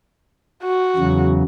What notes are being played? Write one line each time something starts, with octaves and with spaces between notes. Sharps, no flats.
F#4
E2 C#3 F#3